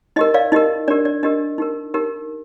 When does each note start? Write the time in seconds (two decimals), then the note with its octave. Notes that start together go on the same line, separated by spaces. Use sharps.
0.16 D#4 G4 A#4 D#5
0.34 D5 F5
0.52 D#4 G4 A#4 D#5
0.88 D4 G4 A#4 D5
1.05 D5
1.23 D4 G4 A#4 D#5
1.58 D#4 G4 A#4
1.94 D#4 G4 A#4